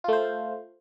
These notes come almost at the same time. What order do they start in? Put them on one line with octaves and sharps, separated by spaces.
F4 A3 C5